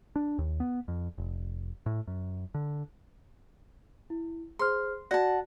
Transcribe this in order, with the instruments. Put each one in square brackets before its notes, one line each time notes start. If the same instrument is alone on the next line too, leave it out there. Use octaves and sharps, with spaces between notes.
[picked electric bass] D4
D#2
B3
F2
F1
A2
F#2
D3
[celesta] E4
[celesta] G#4 C5 F6 [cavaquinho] C6
[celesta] F#4 D5 A#6 [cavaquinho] F#5 A5